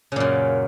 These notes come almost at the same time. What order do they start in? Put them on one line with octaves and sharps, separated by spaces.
C#3 A#2 F#2